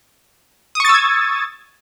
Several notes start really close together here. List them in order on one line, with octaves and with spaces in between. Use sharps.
D#6 C#6 A6 E6 G#6